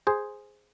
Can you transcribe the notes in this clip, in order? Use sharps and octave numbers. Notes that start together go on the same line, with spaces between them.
G#4 C5